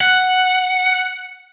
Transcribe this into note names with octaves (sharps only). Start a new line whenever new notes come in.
F#5